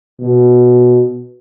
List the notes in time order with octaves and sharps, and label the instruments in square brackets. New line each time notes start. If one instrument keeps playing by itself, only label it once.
[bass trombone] B2